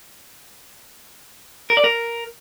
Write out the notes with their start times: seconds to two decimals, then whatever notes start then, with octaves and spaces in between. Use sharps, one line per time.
1.70 A#4
1.77 D5
1.84 A#4